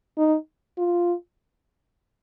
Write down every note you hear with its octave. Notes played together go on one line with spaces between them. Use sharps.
D#4
F4